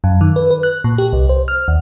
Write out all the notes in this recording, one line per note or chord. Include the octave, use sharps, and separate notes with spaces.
F#2
D#3
B4
B4
F#6
A#2
G4
C2
C5
F6
D#2